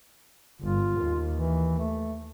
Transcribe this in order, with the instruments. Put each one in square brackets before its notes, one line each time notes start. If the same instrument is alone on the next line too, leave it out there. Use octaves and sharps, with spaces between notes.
[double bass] G1 [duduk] F4
[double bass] D#2
[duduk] E3
A3